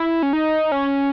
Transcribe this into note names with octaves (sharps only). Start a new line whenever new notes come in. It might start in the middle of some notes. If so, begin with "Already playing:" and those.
Already playing: E4
C#4
D#4
C#4